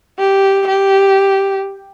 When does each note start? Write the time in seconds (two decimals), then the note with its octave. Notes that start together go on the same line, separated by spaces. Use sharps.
0.19 G4
0.68 G4